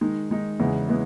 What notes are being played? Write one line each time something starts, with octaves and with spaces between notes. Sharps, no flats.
D#3 G#3 D#4
D#3 G#3 D#4
E2 C#3 G#3 B3 E4
G#3 B3 E4